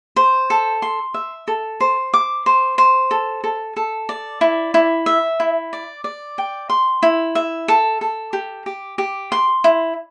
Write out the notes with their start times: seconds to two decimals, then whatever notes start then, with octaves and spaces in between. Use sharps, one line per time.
0.16 C5
0.50 A4
0.82 C6
1.14 E5
1.48 A4
1.81 C5
2.14 D6
2.46 C5
2.78 C5
3.11 A4
3.44 A4
3.76 A4
4.09 D5
4.41 E4
4.74 E4
5.06 E5
5.40 E4
5.73 D5
6.04 D5
6.38 G5
6.70 C6
7.03 E4
7.35 E5
7.68 A4
8.01 A4
8.33 G4
8.66 G4
8.98 G4
9.32 C6
9.64 E4